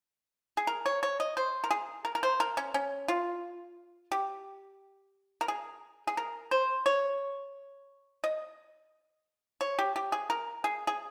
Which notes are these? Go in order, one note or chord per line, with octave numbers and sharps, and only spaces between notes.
G#4
A#4
C#5
C#5
D#5
C5
A#4
G#4
A#4
A#4
C5
A#4
C#4
C#4
F4
G4
A#4
G#4
G#4
A#4
C5
C#5
D#5
C#5
G4
G4
G#4
A#4
G#4
G#4